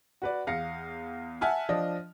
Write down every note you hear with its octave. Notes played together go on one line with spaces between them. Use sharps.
F#4 B4 D5
E2 F5 A#6 C#7
E5 F#5 G#5 A5 F6
F3 D4 D#5